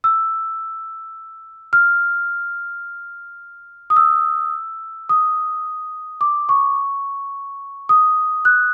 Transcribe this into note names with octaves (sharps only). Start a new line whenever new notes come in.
E6
F6
D#6
E6
D#6
D6
C#6
D#6
F#6